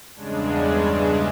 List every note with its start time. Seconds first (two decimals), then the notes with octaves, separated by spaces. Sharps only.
0.15 E2 G2 C#3 G#3 D4